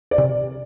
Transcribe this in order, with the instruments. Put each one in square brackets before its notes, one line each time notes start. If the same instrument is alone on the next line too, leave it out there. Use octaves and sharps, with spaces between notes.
[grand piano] D5
[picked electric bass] C3